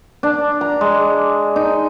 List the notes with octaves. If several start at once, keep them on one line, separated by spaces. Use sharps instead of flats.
D4
A#5
G#3
D#4